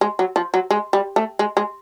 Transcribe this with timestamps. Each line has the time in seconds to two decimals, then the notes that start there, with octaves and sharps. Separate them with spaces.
0.01 G#3
0.19 F#3
0.36 F3
0.54 F#3
0.71 G#3
0.93 G3
1.16 A3
1.39 G#3
1.57 G#3